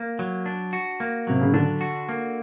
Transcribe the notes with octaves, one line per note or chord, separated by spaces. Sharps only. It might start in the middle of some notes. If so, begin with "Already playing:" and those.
Already playing: A#3
F#3
D4
F#4
A#3
C3 F#3
C#3
D3 D4
F#4
A#3